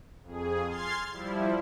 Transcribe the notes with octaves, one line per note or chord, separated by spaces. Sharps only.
F2 G#4
C6 F6 G#6 A6 C7
F3 G3 E4